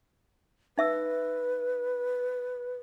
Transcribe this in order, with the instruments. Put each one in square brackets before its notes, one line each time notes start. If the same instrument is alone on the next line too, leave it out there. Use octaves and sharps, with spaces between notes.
[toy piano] D#4 E5 E6 [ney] B4